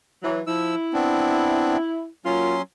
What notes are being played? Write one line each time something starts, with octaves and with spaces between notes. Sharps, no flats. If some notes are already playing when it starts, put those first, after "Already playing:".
E3 F#3
F3 E4 E6
B3 C4 D4
F#3 A#3 C#4 F4 C6